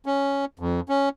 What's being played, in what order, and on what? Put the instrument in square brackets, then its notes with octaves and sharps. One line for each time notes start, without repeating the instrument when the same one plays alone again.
[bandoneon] C#4
F2
C#4